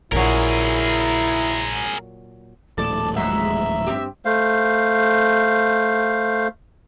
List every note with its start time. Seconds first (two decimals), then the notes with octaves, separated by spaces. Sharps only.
0.12 A#1 A#2 C#3 F#3 E4 G#4 A#4
2.78 D#1 A#1 A2 A4 D5 A5 D6
3.16 E2 F#3 G#3 E5 A#5
3.87 G2 C4 G4
4.25 A3 C5 F5